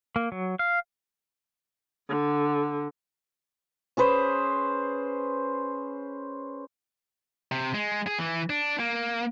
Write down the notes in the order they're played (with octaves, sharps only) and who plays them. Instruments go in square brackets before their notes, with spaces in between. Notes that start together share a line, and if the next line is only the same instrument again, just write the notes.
[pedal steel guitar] A#3
F#3
F5
[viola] D3
[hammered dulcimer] C#4 G#4 B4 C5
[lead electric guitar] C3
G#3
G#4
E3
D4
A#3